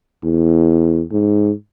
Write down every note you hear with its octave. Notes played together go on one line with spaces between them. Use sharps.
E2
G#2